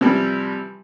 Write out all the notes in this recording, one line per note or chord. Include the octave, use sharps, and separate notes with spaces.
C3 E3 F3 G3